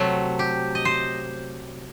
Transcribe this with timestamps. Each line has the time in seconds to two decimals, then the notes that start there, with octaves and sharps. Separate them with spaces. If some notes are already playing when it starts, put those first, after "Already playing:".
Already playing: C3 F#3 A3
0.39 G4
0.75 D#5
0.85 C5